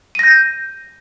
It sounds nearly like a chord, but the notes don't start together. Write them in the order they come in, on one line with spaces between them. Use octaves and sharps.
D#7 A#6 G6